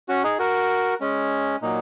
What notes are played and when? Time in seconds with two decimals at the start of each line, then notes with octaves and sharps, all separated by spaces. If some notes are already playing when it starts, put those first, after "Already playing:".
0.09 C#4 F#4
0.24 D#4 G#4
0.39 F#4 A#4
1.01 G#3 C#4
1.62 A#2 F#3 A#3 D#4